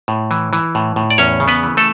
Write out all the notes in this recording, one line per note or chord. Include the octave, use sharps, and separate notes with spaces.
A2
E3
E3
A2
A2
D5
E2 C#4 C#5
C#3
B3 B4
E3
A3 A4